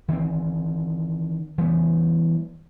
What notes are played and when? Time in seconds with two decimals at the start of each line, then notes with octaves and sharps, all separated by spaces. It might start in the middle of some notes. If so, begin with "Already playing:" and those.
0.08 D#3 E3 G3 C4
1.58 E3 G3 B3